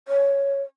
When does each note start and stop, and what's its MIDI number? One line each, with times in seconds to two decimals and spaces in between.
0.08 0.62 73